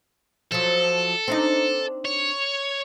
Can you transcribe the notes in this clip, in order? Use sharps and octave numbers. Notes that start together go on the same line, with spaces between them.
F3 F#3 A4
C4 D4 D#4
C#5